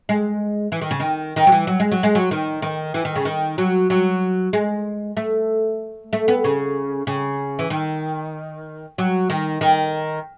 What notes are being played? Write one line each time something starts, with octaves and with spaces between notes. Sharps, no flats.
G#3
E3
D#3
C#3
D#3
D#3
F#3
E3
F#3
G#3
F#3
G#3
F#3
D#3
D#3
E3
D#3
C#3
D#3
F#3
F#3
G#3
A3
A3
B3
C#3
C#3
E3
D#3
F#3
D#3
D#3